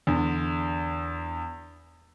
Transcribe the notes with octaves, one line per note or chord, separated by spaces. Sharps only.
E2 D3